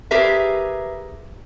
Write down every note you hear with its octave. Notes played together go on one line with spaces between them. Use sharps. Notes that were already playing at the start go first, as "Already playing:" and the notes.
G4 G#4 A#4 B4 E5